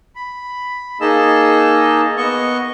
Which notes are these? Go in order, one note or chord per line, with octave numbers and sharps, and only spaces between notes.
B5
A#3 D#4 G#4 D#5 A5 E6
B3 D#5 C#6